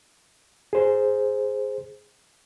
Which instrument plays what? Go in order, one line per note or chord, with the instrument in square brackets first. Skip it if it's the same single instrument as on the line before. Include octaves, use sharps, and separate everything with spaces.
[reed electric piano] G#4 C5